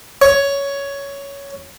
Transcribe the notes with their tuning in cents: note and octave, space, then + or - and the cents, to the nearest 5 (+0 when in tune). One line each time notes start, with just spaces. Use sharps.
C#5 +10